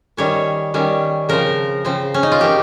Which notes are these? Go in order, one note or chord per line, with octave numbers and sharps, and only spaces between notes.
D#3 G3 C#4 C#5
D#3 G3 C#4
C#3 F3 C4 A#4
C#3 F3 C4
C#4
D#4
F4
C#3 F3 A#3 C#4 G4